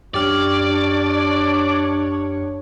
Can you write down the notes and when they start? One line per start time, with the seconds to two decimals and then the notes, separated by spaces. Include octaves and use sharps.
0.14 F#2 D4 G4 C#5 D5 F6